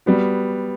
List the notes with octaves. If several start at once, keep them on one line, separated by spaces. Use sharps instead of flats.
G3 B3 F#4